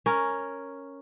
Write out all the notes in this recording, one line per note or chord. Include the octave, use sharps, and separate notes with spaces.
C#4 A#4